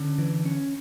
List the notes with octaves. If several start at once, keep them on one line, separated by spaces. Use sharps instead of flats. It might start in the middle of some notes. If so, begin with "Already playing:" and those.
Already playing: D3 C#4
E3
C#4